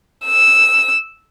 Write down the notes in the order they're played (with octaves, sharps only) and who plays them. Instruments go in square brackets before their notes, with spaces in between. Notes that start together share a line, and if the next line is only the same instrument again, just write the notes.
[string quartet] E6